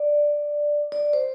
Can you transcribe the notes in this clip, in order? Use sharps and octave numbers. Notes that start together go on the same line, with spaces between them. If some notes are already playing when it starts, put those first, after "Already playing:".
Already playing: D5
D5
C5